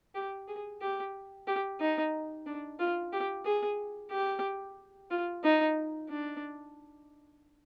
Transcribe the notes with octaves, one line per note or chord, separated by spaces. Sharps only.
G4
G#4
G4
G4
D#4
D4
F4
G4
G#4
G4
F4
D#4
D4